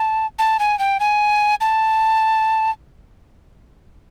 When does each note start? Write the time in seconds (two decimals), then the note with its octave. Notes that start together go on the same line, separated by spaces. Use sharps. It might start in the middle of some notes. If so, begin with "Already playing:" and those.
Already playing: A5
0.39 A5
0.59 G#5
0.79 G5
1.00 G#5
1.61 A5